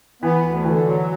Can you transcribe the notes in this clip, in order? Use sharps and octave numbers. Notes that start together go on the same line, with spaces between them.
E3 B3
D2
D3 E3
F#3